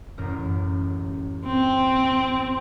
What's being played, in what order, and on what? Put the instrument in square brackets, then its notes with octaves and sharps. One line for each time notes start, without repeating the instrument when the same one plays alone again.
[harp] A1 F#2 A#4
[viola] C4